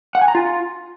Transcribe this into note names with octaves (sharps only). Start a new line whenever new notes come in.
F#5
G#5
A#5
F4